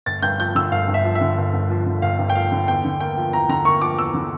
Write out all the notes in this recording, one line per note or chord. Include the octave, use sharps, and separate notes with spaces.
G1 A6
G2 G6
F3 G6
D3 E6
G1 F5
G2
E5
F3
E5
D3
G1
G2
F3
D3
G1 F5
G2
G5
F3 F5
D3
E2 G5
D3
A#3 G5
F3
E2 A#5
D3 A#5
A#3 C#6
F3 D6
E2 E6
D3